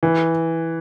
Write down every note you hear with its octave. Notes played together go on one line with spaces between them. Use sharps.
E3